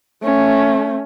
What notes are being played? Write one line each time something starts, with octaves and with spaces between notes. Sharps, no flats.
A3 C#4